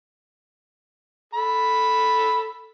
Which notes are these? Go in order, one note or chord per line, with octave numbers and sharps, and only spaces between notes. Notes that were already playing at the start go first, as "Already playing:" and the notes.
A4 B5